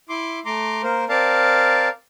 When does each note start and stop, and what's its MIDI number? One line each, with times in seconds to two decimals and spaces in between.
0.09 0.39 64
0.09 0.39 84
0.09 0.39 86
0.46 0.82 57
0.46 0.82 82
0.46 0.82 84
0.46 0.82 86
0.83 1.05 58
0.83 1.05 70
0.83 1.05 72
1.09 1.89 60
1.09 1.89 70
1.09 1.89 74
1.09 1.89 77
1.09 1.89 81